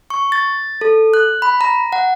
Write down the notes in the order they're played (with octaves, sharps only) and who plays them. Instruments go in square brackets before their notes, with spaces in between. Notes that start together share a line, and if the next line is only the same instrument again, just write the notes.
[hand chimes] C#6
A6
A4
F#6
B5
A#5
F#5